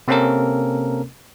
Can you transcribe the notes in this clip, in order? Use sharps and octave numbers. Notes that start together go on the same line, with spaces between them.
C3 A#3 C4 C#4 A4 A#4